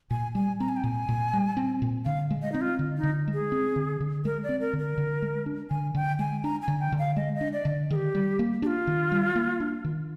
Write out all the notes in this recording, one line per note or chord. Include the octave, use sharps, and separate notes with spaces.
A#2 G#5
G3 G#5
C4 A#5
G#5
G5
A#2 G#5
A#2
G3
C4
A#2
D3 F5
G#3
D#5
C4 D#4
F4
D3
D#4
D3
G#3
G#4
C4
D3
D3
G#3 A#4
D5
C4
A#4
D3
A#4
D3
G#3
D4
D3 G#5
D3 G5
G#3 G#5
D4 A#5
G#5
D3
G5
D3
F5
G#3 D#5
D#5
D4
D5
D3
D#3 G4 G#4
G3
A#3
D4 F4 G4
D#3
G3
A#3
D4
D#3